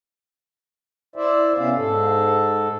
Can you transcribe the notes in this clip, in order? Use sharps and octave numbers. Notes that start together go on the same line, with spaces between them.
E4 C5 D5 E5
C3 B3 C#4 E5 F5
G#2 A4